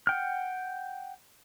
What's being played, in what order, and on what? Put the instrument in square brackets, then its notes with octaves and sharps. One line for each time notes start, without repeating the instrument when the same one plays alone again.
[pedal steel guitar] F#5 G5 F6